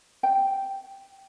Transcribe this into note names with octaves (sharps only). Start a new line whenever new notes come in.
G5